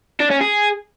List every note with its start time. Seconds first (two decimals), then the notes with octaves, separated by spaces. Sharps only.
0.20 D4
0.31 C#4
0.41 G#4